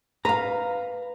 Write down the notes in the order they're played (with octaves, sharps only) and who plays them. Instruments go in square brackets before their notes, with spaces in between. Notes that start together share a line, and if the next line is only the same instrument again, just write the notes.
[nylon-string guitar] B4 F5 [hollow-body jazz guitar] A#5